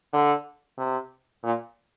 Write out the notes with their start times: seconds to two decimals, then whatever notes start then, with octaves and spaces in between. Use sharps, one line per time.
0.13 D3
0.78 C3
1.43 A#2